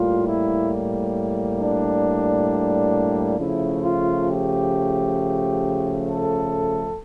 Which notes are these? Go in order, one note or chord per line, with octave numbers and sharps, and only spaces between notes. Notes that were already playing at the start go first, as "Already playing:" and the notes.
Already playing: A2 G3 A#3 F4
E4
D4
C#3 F3 A3 E4
F4
G4
A4